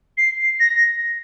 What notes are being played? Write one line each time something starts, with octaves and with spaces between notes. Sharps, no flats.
C7
A#6